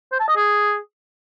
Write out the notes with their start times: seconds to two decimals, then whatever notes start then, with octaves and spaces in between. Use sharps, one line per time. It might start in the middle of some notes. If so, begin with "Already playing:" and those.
0.12 C5
0.20 A5
0.28 D#5
0.36 G#4